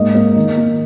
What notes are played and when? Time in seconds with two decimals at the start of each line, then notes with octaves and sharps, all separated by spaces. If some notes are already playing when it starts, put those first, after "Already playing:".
Already playing: G#2 A#3 D#5
0.15 A#3 D#5
0.36 D#3
0.57 A#3